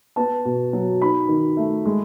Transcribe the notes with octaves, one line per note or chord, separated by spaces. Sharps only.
B3 A5
B2
F#3
D#4 B5
D#3
A3
G#3